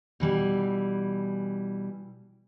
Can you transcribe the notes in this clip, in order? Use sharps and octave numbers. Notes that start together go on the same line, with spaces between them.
B2 E3 G3